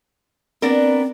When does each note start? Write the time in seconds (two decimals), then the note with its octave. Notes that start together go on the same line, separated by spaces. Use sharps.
0.62 B3 C4 D4 A#4